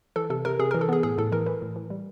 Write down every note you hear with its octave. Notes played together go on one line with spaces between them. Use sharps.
E3 A4
C3 A4
C3 A#4
C3 G#4
E3 A#4
A4
B3 G#4
A2 G#4
A2 A4
E3 A#4
E3 B4
A2
E3
G3